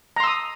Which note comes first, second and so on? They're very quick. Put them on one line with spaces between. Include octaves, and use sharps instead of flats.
A#5 C6 E6 D#6